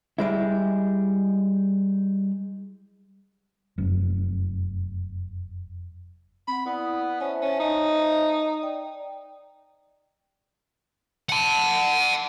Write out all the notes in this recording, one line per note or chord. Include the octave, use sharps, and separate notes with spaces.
G3 G#3 E4
F1 F#2
C4 F#5 B5
B3 E4 D5 D#6
C#4 C5 E5 A5
C#4
D#4
D5 G5
F#5 A5